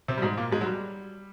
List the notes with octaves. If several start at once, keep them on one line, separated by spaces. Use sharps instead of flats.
C3 C4
G3
G#2 G#3
A#2 A#3
G#2 G#3
F#3
G3